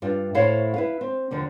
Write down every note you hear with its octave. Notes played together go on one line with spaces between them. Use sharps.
G2 D4 F4
A2 E4 A4 C5 C#5 F5
E4 B4 F5
C4
D#2 D3 F3 A#3